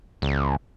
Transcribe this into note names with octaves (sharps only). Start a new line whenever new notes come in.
C#2